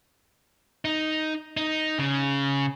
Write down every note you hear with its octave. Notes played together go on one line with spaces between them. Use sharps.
D#4
D#4
C#3